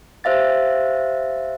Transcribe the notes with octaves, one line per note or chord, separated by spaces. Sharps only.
G4 C5 E5 F5 A6